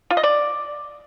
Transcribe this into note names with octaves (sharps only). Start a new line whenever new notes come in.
F4
D#5
D5